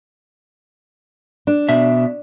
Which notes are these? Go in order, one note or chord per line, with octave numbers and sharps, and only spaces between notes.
D4
B2 E5